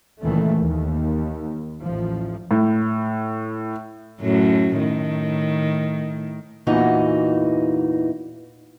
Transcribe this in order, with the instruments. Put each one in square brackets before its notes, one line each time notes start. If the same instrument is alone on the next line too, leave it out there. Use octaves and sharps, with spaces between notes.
[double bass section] C#2 A#2 D#3 E3 A3
D#2
A1 F3
[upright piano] A2
[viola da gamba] F#2 A2 F#3
A2 D#3
[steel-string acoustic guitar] E2 A#2 E3 D#4 F#4